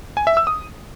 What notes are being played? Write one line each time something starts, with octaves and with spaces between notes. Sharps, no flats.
G#5
E5
E6
D#6